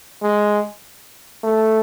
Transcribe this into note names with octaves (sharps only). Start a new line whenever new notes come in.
G#3
A3